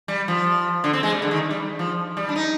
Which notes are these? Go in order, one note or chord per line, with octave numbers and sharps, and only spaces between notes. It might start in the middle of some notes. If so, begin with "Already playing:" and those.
G3
F3
D3
C4
G#3
G3
D3
D#3
G3
F3
G3
D4
D#4